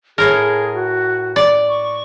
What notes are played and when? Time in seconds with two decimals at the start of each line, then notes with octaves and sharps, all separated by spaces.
0.18 A2 G#4 A#4
0.74 F#4
1.36 D5
1.69 C#6